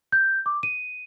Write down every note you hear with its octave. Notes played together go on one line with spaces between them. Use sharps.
G6
D6
D#7